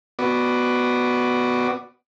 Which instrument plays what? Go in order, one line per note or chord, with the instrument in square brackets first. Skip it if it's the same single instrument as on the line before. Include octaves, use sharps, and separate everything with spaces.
[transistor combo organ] B3 F#4 D5